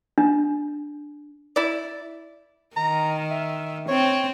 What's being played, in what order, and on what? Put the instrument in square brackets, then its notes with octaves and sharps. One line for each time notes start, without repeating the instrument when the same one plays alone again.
[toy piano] D4
[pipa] E4 D5
[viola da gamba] D#3 [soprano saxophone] A#5
[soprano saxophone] E5
[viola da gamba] C4 [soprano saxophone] C#5